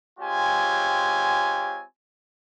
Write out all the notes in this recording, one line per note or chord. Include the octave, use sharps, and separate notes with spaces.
G#3 C4 F4 G4 C#5 G#5